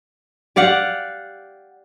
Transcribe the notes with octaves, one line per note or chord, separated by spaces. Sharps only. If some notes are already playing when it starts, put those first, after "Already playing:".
G4 D5 F5 F#5